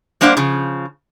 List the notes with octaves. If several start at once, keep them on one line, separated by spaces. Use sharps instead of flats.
G3 A#3 D4 C5 F5 F#5
C#3 F3